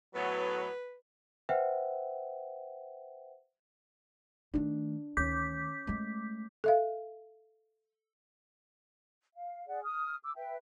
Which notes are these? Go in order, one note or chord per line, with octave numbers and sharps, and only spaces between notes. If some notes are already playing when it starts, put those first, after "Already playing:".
A2 F#3 B3 B4
B4 C5 E5 F#5 G5
D#3 A3 D4
D2 D#3 C#4 D6 G6 B6
G#3 A3
A4 E5 F5
F5
G#4 D5 F#5
D#6 F6
D6 E6
B4 E5 G5